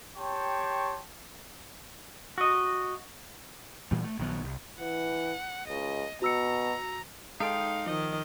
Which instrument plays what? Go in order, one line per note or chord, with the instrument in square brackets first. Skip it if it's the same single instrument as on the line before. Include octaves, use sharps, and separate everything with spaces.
[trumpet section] G4 C#5 G5 A5 C6 C#6
[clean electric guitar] F#4 D#5
[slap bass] A#2 E3 G3 A3
A3
A#1 D#3 F#3 B3
C2
[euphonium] E3 [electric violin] F#5
[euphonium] C#2 [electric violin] D#5
[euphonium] B2 [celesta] F#4 E6 C#7 [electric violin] A#5
[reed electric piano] G#3 A4 C6 [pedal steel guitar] D#4 G5 [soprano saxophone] F5
[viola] D#3 D#5 [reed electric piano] F3